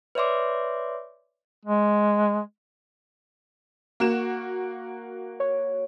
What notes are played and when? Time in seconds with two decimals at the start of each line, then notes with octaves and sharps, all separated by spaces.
0.15 B4 C#5 D5 E5 C6 D6
1.65 G#3
4.00 A#3 F#4 E7
5.40 C#5